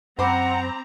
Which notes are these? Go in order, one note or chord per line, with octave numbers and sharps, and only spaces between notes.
F#2 C4 C5 F#5 A#5 B5 D6